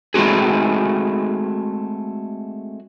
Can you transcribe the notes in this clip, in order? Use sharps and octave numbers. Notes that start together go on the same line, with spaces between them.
G#3 A3 C4 F#4 G#4